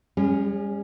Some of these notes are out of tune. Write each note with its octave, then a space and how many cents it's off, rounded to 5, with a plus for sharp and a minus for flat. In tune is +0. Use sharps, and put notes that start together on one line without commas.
G3 +45 C#4 -5 G#4 +0